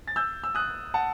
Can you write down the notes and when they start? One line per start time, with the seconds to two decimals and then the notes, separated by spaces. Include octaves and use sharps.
0.07 A6
0.16 E6 G6
0.44 E6
0.55 D#6 F#6
0.94 F#5 A5